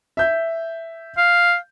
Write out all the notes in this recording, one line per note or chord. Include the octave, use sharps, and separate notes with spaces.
E5 G6
F5